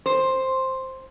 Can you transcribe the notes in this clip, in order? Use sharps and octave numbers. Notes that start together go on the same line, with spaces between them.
C5